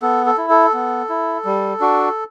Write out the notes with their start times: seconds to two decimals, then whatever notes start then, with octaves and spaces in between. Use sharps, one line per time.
0.02 B3 A4
0.26 A4
0.38 E4
0.50 A4
0.74 B3
1.09 E4
1.45 G3
1.80 D4 F#4